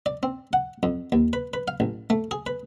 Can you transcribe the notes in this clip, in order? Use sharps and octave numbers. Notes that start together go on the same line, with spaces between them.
D5
C4
F#5
F2
D#2
B4
B4
F5
A1
A3
G#4
B4